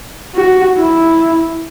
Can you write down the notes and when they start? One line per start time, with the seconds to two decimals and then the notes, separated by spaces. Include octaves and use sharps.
0.35 F#4
0.77 E4